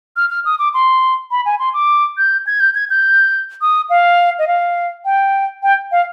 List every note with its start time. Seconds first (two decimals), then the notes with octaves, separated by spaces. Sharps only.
0.16 F6
0.30 F6
0.45 D#6
0.59 D6
0.74 C6
1.31 B5
1.45 G#5
1.59 C6
1.74 D6
2.17 G6
2.47 G#6
2.60 G6
2.75 G#6
2.90 G6
3.61 D#6
3.90 F5
4.39 D#5
4.47 F5
5.05 G5
5.63 G5
5.92 F5